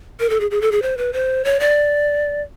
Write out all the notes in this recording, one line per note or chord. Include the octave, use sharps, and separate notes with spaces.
A#4
A4
G#4
G#4
A4
G#4
C5
B4
C5
C#5
D5